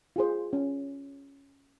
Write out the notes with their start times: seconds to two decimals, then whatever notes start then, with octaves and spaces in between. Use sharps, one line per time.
0.16 F4 G#4 C5
0.53 C#4